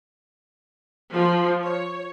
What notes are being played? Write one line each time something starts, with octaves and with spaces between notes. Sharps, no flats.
F3
C#5